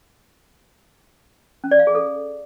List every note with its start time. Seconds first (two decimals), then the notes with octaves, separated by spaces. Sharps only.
1.64 C#4
1.71 D5
1.79 F5
1.87 G#4
1.95 A4